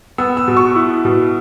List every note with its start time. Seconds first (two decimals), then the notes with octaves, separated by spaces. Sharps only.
0.18 B3 E6
0.37 E6
0.48 B2
0.57 C#6
0.76 E4
1.05 B2